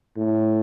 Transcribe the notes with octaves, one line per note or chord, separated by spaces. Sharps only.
A2